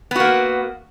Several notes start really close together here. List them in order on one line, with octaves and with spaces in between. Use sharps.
B3 F#4 A#3